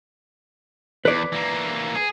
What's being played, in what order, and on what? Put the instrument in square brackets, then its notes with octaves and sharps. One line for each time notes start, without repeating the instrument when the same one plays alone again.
[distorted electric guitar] E2 [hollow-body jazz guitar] B4 D5
[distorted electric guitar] E3 A#3
G#4